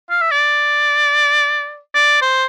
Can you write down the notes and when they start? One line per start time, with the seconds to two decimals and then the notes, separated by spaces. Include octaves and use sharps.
0.10 F5
0.21 E5
0.31 D5
1.94 D5
2.22 C5